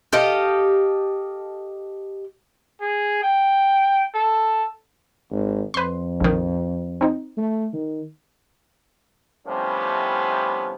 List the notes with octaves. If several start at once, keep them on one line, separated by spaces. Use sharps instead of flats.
G4 A4 D#5 F5
G#4
G5
A4
G#1
F2 B4 C6
A#1 D#3
C4 D#4
A3
D#3
A2 C3 F3 G3 B3 C#4